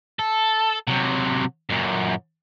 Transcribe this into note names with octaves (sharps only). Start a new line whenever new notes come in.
A4
C3 F#3
F#2 A#2